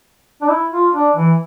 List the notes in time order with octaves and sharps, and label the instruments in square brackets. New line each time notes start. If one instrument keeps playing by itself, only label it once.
[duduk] D4
E4
F4
D4
E3